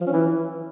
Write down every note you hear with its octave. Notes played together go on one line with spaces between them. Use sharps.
F3
C#4
E3